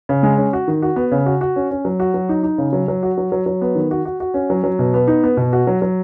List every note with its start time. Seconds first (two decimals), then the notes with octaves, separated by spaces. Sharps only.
0.09 C#3
0.23 G#3
0.38 C#4
0.53 F#4
0.68 D#3
0.82 F#4
0.96 B3
1.11 C#3
1.26 F#4
1.41 F#4
1.56 C#4
1.71 C#4
1.85 F#3
2.00 F#4
2.14 F#3
2.29 D#4
2.43 D#4
2.58 C#3
2.73 F#3
2.88 F#3
3.03 F#4
3.18 F#3
3.32 F#3
3.46 F#3
3.61 B3
3.75 D#3
3.91 F#4
4.05 F#4
4.20 F#4
4.34 C#4
4.50 F#3
4.64 F#3
4.79 B2
4.94 B3
5.07 D#4
5.23 B3
5.37 B2
5.53 F#4
5.67 F#3
5.82 F#3